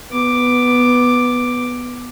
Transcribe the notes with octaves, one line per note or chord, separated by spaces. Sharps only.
B3 D6